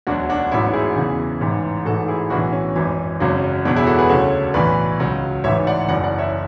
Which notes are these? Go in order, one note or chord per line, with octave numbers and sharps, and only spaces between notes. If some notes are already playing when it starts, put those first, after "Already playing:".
E1 D2 D3 F#3 D4 F#4
D4 F#4
A1 G#2 F#3 C#4 E4
E4 G#4
E2 C#3 E3
A1 G#2 E3
A1 G#2 E3 F#4 A4
E4 G#4
B1 A2 E3 D4 F#4
C#4
G#1 F#2 E3
G#1 F#2 C#3 F#3
E1 E2 B2 F#3 D4
E4 G#4
F#4 A4
G#4 B4
D2 C#3 F#3 A4 C#5
B1 A2 E3 B4 D5
C#2 C#3 F#3
A1 G#2 E3 C#5 E5
D5 F#5
F#1 F#2 E3 D5 F#5
D5 F#5
C#5 E5